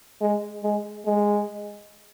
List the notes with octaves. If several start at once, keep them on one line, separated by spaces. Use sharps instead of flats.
G#3
G#3
G#3